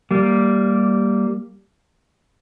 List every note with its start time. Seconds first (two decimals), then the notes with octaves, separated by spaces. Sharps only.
0.11 G3 A#3